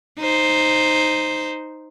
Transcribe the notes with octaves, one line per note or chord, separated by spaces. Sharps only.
D#4 C5